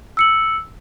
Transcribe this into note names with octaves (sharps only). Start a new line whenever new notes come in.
E6 C#7 F#7